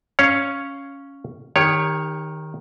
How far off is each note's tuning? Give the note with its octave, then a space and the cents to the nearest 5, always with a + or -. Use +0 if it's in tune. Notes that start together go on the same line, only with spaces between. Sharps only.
C#4 +0 C#5 +0 F5 +0
D#3 +0 G4 +30 C#5 +0